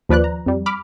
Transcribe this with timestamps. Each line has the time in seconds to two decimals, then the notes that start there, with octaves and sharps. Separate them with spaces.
0.09 D#2 F3 B4 D5 F#6
0.24 A#5
0.46 F2 G3
0.66 B5 D6 F6